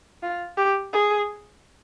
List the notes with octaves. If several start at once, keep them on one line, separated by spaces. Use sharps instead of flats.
F4
G4
G#4